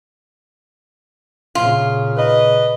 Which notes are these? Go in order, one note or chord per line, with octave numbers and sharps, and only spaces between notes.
A#2 C#3 F4
B4 D#5